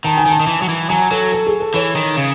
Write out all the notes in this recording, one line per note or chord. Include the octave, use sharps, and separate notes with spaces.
D#3 A5
G#5
D#3 A5
D#3
E3
F#3
E3
F#3 G#5
F#3 A4
A4
G#4
A4
E3 C#5
D#3
C#3